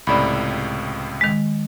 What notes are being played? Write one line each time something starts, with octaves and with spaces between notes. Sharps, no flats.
C#2 A2 C3 D5 B5
D#3 G#3